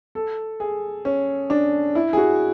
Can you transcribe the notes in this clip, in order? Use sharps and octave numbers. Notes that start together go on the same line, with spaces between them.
A4
G#4
C#4
D4
E4
G#4
F#4